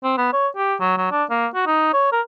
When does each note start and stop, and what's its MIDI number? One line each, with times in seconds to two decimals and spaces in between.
0.03 0.15 60
0.17 0.29 59
0.33 0.47 73
0.56 0.75 67
0.80 0.96 54
0.97 1.08 54
1.11 1.24 62
1.30 1.47 58
1.54 1.65 66
1.66 1.92 63
1.93 2.07 73
2.12 2.21 70